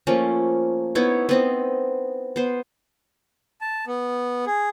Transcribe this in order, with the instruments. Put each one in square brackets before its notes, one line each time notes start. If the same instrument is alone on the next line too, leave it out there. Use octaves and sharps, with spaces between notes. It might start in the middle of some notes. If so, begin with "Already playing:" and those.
[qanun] F3 A3 A#3 C#4
B3 D#4 E4 C#5
B3 C4 D#5
B3 C5
[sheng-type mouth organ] A5
B3
G#4